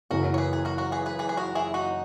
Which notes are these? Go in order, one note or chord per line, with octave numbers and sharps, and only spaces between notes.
F#1 F#2 E3 F#4 A#4
C#5
G#4 B4
G#4
F#4 A#4
F#4 A#4
G#4 B4
G#4 B4
G#4 B4
G#4
F#4 A#4
E4 G#4
D#4 F#4